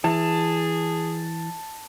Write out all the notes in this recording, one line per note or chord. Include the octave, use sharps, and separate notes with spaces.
E3 G#4 A5